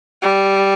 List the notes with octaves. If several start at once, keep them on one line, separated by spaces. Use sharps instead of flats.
G3